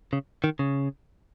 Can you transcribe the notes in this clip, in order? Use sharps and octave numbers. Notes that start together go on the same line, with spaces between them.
C#3
D#3
C#3